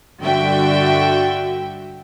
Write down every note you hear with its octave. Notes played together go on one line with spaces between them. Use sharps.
G2 D3 F#4 E5 G5